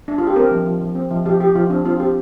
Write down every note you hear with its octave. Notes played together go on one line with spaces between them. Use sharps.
D4
F4
G4
C4 A#4
F3
F3
F3
C4
F3
F3 G4
F3 G4
F3 F4
C4 D4
C4 F4
C4 G4